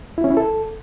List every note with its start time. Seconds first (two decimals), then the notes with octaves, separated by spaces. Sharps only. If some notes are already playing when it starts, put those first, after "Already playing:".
0.18 E4
0.24 C#4
0.31 E4
0.37 A4